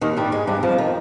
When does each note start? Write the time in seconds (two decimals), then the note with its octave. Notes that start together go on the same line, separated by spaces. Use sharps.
0.01 D#2 D#3
0.17 G2 G3
0.32 G#2 G#3
0.47 G2 G3
0.63 F2 F3
0.78 D#3